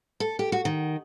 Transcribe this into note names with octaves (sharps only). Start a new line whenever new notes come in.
A4
G4
F#4
D#3